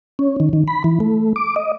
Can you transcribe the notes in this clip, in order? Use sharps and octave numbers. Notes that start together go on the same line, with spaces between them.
C#4
D#3
D#3
B5
E3
A3
D6
D#5